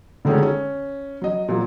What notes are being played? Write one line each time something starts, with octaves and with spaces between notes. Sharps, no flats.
D3 D#3 G#3 A3 C#4
C#4
F#3 D#5
A#2 F3 F#3